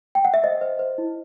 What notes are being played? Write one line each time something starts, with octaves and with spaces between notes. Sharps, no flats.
G5
F#5
E5
C5 D#5
C5
C5
E4